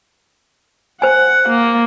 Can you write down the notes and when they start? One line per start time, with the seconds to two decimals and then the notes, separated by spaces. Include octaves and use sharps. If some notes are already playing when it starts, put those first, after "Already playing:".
1.02 C5 F#5 G#5
1.49 A#3